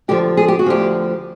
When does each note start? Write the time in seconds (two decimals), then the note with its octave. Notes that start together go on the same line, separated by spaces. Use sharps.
0.08 D2 D3 F3 G4
0.37 G#4
0.48 G4
0.59 F#4
0.66 D2 D3 F3 G4